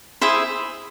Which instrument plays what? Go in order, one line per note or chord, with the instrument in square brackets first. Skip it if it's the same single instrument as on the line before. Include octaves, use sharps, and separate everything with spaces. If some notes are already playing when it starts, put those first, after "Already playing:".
[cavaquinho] E4 G#4 C5 E5